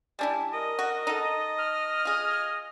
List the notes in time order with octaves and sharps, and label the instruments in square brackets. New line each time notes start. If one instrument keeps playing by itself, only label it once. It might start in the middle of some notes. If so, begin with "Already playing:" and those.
[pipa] G3 D4 E4 [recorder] G#5
[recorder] A#4 [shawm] D#5
[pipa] F#4
D#4 A4
[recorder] F6
[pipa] F4 G#4